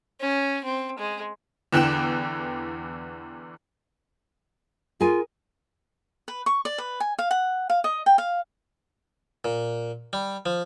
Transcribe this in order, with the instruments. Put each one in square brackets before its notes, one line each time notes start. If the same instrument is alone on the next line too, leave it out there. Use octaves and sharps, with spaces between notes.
[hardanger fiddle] C#4
C4
G#3
[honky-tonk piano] E2 D3 E3 G5 F#6 E7
[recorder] F4 [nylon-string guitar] G#4 A#4 G#5
[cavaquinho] B4
C#6
D5
B4
G#5
F5
F#5
F5
D#5
G5
F5
[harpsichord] A#2
G3
F3